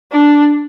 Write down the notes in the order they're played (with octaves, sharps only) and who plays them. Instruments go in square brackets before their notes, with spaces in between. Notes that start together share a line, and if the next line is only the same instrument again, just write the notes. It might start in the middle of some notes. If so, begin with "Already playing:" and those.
[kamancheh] D4